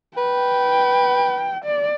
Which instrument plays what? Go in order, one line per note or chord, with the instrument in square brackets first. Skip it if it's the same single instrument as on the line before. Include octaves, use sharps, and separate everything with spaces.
[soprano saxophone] B4 [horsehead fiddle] G5
[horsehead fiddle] D5